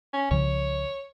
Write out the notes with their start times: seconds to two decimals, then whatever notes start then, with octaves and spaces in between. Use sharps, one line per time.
0.13 C#4
0.31 C2 C#3 F3 C#5